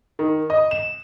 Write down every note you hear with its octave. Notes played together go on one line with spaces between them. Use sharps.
D#3
D#5
E7